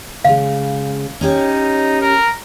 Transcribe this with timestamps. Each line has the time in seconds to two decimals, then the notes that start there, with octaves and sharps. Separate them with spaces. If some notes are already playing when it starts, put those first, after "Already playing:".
0.25 C#3 G#3 F5
1.21 C#4 D#4 G4 C#5
2.01 A#4